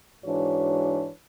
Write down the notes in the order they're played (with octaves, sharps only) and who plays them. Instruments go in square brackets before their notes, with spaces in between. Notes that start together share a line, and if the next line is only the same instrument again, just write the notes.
[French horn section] G#2 E3 D4 F#4 C#5